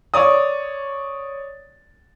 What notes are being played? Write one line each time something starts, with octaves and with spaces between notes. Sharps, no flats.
C#5 D5 D#6